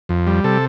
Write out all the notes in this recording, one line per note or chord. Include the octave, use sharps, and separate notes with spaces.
F2
G3
C3 A4